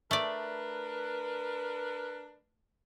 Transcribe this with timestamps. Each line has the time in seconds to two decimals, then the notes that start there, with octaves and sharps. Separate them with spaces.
0.11 A3 D4 A#4 B4 D5